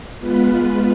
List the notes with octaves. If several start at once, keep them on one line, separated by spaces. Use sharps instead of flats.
G#3 B3 F4 B4